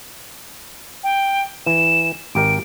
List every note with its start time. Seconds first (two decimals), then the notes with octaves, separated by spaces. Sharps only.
1.03 G5
1.66 E3 E7
2.35 G#1 G4 A#4 D7